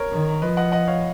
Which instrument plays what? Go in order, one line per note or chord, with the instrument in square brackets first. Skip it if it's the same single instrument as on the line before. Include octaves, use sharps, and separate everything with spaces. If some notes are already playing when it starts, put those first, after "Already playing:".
Already playing: [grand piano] A#4 C#5
[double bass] D#3
[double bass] F3 [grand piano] B4 D#5
[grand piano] D#5 F#5
D#5 F#5
C#5 F5